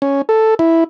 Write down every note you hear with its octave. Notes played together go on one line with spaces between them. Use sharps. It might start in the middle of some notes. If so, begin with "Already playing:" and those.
C#4
A4
E4